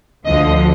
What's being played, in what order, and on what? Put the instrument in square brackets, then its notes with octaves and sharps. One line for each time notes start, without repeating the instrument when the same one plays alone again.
[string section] D2 D3 F3 D#5